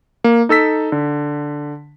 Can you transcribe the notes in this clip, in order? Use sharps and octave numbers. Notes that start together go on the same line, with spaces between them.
A#3
D#4 A4 E6 B6
D3